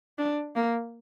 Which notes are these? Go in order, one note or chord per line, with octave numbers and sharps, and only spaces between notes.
D4
A#3